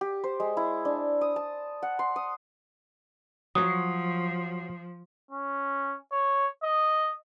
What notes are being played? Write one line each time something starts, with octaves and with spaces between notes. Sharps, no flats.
G4
C5
G#3
E4
D4
D#6
A5
F#5
C6
D#6
F3 F#3 F#4 C#5 D#6
C#4
C#5
D#5